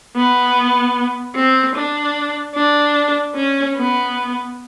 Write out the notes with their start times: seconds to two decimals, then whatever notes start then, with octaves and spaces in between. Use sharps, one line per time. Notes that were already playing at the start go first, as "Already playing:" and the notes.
0.16 B3
1.36 C4
1.76 D4
2.55 D4
3.35 C#4
3.76 B3